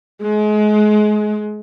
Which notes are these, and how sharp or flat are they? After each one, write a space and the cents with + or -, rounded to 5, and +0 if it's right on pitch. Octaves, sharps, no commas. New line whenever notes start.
G#3 +30